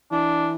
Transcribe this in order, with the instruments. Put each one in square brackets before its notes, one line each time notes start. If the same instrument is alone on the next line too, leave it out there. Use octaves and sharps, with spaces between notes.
[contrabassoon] E3 [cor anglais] D4